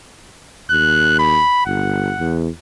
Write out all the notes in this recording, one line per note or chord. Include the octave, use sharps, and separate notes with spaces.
D#2 F#6
B5
G1 F#5
E2